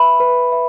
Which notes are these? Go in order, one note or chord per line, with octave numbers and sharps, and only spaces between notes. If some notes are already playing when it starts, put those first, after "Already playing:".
Already playing: B4 E5 B5
B4
E5